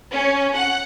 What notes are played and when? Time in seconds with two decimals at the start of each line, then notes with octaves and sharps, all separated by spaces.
0.11 C#4
0.54 F#5